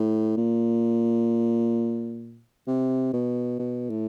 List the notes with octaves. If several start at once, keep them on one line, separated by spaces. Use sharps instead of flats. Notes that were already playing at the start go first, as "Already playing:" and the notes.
Already playing: A2
A#2
C3
B2
B2
A2